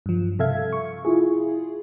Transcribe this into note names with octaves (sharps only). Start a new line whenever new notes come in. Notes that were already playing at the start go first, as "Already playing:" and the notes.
G2 F3
C3 A4 E5 F5 G#6
C#6
E4 F4 G#4